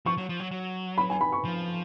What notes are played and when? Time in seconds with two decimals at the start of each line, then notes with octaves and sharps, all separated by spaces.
0.06 F3 C#6
0.18 F#3
0.29 F3
0.40 F#3
0.51 F#3
0.98 B5
1.10 G#5
1.21 B5
1.33 C#6
1.45 F3